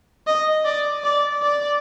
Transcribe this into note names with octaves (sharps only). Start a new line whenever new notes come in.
D#5
D5
D5
D5